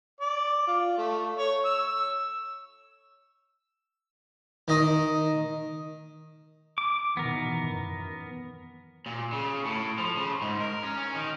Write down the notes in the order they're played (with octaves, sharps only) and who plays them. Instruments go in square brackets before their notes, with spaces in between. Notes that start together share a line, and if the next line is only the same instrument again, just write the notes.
[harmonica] D5
F4
A3
C#5
E6
[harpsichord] D#3 D#5
[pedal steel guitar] D6
[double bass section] B2 D#3 E3 [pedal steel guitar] B3 A#4
[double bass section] F#2
[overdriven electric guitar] A#2
C#3
A2
F3
C#3
G#2
A#4
C#4
C#4
D#3